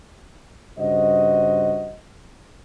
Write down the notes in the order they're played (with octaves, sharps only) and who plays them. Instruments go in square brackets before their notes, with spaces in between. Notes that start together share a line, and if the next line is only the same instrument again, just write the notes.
[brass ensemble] G2 C#3 F#4 C5 D#5